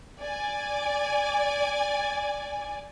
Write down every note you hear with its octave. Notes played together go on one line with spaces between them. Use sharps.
D5 G#5